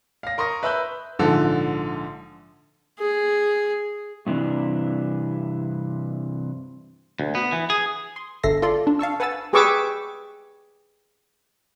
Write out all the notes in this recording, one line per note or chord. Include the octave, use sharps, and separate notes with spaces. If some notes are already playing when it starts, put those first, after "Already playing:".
F5 A#6
A#4 C6 C#6 D#6 A#6
B4 E5 B5 E6 F#6 G6
A#1 G#2 D3 F3 A4
G#4
G2 C3 E3 D4
D2
B3
E3
G#4
C6
G1 D3 A4 E5 A#6 C7
F4 A4 D5 C6
D4
F5 A5 C#6 E6
B4 F#5 G#5 A5 E6 A6
G4 G#4 B4 C#6 D6 E6